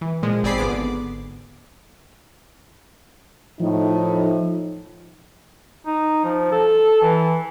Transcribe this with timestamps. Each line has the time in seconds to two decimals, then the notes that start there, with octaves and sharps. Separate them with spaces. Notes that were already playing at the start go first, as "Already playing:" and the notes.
0.01 E3
0.23 A#2 F3 G#3
0.43 G#1 C4 G#4 D5 B5 C7
0.58 G#1 D3 B3 D6
3.60 A2 F3 D#4
5.86 D#4
6.24 F3
6.52 A4
7.02 E3